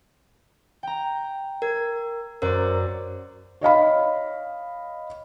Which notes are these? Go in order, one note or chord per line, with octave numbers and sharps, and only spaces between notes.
G5 A#5
A#4 G#6
F#2 A#4 C5 D5
C#5 D#5 F5 B5